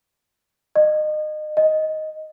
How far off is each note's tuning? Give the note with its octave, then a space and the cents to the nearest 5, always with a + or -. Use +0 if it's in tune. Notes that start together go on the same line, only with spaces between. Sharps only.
D#5 -30
D#5 +5